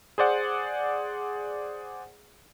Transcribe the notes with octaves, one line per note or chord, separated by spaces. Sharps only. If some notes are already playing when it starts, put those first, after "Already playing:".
G#4 C5 D5 F#5